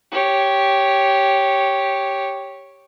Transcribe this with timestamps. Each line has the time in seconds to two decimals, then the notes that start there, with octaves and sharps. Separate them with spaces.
0.12 G4 C#5